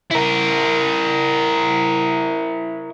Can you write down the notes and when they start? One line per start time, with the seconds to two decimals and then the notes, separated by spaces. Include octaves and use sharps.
0.11 E4 A#4